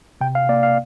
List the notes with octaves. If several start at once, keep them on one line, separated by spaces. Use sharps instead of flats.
C3 G5
F5
A#3 D5
F5